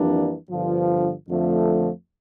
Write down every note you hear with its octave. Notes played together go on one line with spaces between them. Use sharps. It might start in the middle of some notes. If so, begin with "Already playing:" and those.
Already playing: F2 E3 G3 A#3 D4
G1 G2 D3 F3
F2 D3 F3 A3